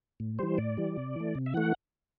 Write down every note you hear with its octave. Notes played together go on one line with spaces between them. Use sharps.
A2
E3 G3 C5
A2 D5
E3 G3
C3
E3 A3
C3
E5
E3 A3 F#5